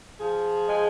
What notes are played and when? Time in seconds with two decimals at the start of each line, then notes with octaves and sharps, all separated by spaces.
0.19 F3 G#4
0.67 G#3